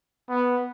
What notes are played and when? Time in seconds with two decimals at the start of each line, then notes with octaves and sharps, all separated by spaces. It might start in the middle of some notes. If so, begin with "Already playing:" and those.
0.29 B3